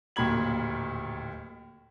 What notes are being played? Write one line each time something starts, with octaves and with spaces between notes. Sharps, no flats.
D1 D#2 A#2 B5 G#6 F#7